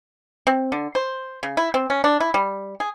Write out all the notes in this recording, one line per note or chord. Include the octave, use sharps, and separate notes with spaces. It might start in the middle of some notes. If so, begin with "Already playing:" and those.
C4
D3
C5
C#3
E4
C4
C#4
D4
E4
G3
G#4